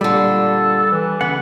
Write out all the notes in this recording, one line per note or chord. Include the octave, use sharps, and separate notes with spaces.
A#2 D3 G3 A4
E3
C#3 A3 B3 F#5